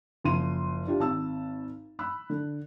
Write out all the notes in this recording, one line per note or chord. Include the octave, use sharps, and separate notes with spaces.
F#1 F3 C6 D#7
D4 F4 G4
G#1 A5 E6
B5 E6 F#6
D3